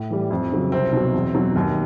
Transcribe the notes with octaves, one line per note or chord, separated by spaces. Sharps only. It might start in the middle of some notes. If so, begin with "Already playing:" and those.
Already playing: A2
E3 G3
F2
C#3 F#3
C2 C4
B2 F#3
E2
B2 F#3
D#2